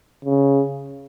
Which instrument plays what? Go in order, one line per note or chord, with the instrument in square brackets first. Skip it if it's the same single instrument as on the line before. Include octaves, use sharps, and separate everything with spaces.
[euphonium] C#3